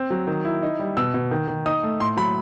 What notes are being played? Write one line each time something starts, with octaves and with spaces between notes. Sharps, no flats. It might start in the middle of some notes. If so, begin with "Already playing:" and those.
Already playing: C4
F#3
D#3
E4
D#4
G3
B2 E6
B2
D#3
D#3
D#4 D#6
A3
A2 C6
F#3 B5